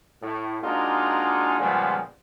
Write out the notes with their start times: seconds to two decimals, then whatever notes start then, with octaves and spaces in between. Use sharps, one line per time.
0.22 A2
0.63 G#3 A#3 D4 D#4 F4 F#4
1.60 A#2 C#3 F3 G3 G#3 B3